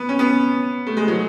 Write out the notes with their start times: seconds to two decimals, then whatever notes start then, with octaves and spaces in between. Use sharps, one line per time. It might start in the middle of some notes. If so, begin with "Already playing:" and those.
Already playing: B3
0.09 C#4
0.19 B3
0.87 A3
0.97 G#3
1.08 F#3